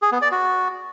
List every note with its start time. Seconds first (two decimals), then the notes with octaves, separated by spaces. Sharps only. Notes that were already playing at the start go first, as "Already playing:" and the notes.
0.02 G#4
0.12 B3
0.22 D5
0.32 F#4